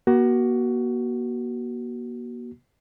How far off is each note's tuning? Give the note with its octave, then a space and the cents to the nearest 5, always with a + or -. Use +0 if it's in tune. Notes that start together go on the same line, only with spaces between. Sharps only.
A#3 +45 F#4 +20